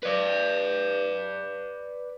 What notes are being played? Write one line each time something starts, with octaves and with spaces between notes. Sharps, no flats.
B4 D5